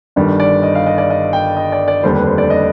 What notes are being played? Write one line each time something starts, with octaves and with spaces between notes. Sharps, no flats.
G1 G2 D#3 G3
D5
D#5
F5
D#5
D5
D#5
G5
D#5
D5
D5
F1 D#2 D3 G3 C5
B4
C5
D5
D#5